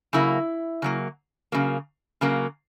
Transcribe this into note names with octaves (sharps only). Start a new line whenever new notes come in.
C#3 F#3 A#3 E4
C#3 F#3 A#3
C#3 F#3 A#3
C#3 F#3 A#3